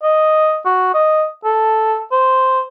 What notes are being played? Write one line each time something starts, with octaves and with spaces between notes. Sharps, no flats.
D#5
F#4
D#5
A4
C5